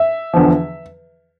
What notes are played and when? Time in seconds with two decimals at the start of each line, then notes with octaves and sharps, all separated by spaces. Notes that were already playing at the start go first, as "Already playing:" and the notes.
Already playing: E5
0.34 E2 D3 F3